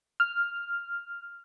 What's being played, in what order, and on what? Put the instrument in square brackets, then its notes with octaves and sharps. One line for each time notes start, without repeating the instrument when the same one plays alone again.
[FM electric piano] F6